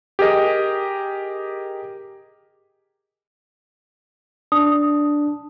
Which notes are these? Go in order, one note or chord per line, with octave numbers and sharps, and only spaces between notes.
G4 G#4 A#4 D#5
D4 D#6